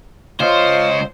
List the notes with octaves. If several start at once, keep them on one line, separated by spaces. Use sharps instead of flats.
C#2 F4 C5 C#5 D#5